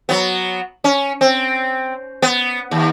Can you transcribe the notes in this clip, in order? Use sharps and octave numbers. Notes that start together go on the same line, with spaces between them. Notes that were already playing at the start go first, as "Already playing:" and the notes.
F#3 B3
C#4
C4
B3
D#2